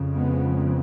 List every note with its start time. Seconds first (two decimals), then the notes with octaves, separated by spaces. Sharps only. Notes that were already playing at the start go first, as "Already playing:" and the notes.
Already playing: F2 C#3
0.15 G#3 B3